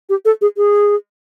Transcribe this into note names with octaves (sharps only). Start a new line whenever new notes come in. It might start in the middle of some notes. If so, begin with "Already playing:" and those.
G4
A4
G#4
G#4